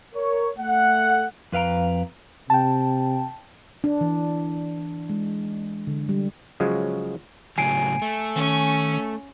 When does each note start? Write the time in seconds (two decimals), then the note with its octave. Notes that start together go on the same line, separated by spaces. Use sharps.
0.15 A#4 C#5
0.59 A3 F#5
1.52 F2 B4 F5 G5 A#5
2.50 C3 G5 A5
3.84 D4
4.01 E3
5.10 G#3
5.87 D3
6.09 G3
6.60 C#3 F3 F#3 G#3
7.58 A2 C#3 F#3 G#5 C7 D7
8.02 A3
8.36 D#3 C#4